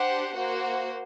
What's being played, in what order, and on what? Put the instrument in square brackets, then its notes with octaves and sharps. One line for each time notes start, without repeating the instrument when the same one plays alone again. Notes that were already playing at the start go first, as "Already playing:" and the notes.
Already playing: [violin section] D4 G4 C5 F#5
A#3 F#4 C5